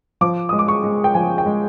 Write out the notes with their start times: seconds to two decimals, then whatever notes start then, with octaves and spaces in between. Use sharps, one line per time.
0.21 F3 D6
0.49 G#3 D#6
0.59 D6
0.68 C#6
0.84 G#3
1.04 G5
1.14 F3 G#5
1.38 G5
1.46 G#3